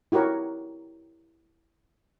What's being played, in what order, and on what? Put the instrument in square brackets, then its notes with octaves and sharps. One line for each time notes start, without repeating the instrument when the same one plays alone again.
[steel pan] E4 F#4 G4 A#4 C#5